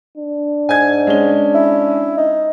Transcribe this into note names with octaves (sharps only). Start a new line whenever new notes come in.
D4
G#2 G#5 G#6
G#3 C#4 G7
E4
D#4